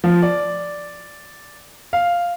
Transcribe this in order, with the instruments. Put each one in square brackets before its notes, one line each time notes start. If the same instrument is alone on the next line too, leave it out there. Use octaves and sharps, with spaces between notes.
[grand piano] F3
D5
F5